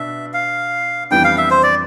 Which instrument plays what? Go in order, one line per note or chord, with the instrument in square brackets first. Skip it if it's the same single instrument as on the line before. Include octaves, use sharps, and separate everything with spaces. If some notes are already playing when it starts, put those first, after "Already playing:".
Already playing: [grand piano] B2 B3 D4 [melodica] E5
[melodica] F5
[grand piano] F2 E3 G3 B3 D4 [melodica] G5
[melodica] F5
E5
C5
D5